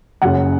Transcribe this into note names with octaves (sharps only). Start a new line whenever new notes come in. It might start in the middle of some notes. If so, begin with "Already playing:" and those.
F#1 F#2 C#3 F#5